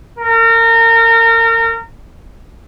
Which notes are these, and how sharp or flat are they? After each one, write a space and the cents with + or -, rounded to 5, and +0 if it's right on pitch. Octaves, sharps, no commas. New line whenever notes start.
A#4 -30